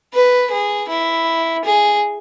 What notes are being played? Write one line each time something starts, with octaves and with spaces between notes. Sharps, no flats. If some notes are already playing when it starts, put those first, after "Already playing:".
B4
G#4
E4
G#4